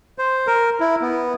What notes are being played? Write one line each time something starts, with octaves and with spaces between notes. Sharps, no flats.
C5
A#4
E4
B3